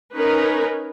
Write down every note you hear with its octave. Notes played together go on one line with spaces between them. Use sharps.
C#4 D#4 A#4 B4